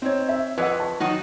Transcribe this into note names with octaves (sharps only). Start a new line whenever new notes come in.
C4 D#4 C#5
E5
F2 B4 D#5 F#5 E6 G#6
A5 C#6
D#3 F#3 D#4 F#4